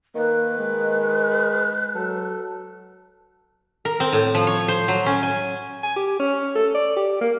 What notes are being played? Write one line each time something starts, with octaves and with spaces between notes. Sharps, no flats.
D#3 A#3 B4
G#3
F#3 A4
A#4
C4
A2
F3
C#5
C5
F#3
C#4
G#5
G#5
G4
C#4
A4
D5
G4
A#3